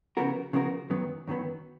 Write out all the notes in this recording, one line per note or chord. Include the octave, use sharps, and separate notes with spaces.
C#3 F3 B3 F#4 A#4
C#3 F3 B3 F#4 A#4
F#2 D#3 F#3 B3
F#2 D#3 F#3 B3